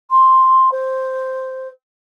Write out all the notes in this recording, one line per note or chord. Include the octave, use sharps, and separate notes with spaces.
C6
C5